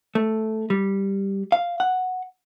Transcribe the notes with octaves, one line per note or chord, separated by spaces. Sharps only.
A3
G3
F5
F#5